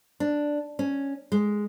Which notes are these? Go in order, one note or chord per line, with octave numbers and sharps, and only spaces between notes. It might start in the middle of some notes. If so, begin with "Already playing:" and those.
D4
C#4
G#3